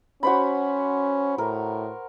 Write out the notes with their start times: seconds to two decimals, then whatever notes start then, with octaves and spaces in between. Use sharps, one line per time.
0.23 C#4 F#4 C5 B5
1.38 A2 A#4